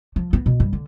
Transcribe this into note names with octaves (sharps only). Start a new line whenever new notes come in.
F3
B3
B2
G2
D3